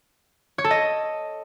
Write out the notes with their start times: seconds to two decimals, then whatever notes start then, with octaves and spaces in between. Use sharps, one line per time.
0.58 C#5
0.64 A4
0.71 D#5